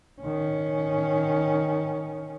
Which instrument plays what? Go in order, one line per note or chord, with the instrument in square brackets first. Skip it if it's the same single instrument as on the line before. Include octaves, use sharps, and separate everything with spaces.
[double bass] D#3 C#4